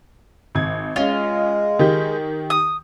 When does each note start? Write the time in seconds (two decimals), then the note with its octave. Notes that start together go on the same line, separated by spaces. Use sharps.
0.55 G#1 G#6
0.96 G#3 C#4 F4 D#5
1.79 D#3 G4 G6
2.50 D#6